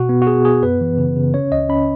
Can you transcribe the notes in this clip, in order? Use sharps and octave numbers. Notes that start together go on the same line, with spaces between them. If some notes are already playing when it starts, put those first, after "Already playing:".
Already playing: B2 F#4
B3
F#4
B3 G#4
B3 G#4
F#2 B4
E3
C#3
C#3
C#4 C#5
C#2 D#5
C#4 B5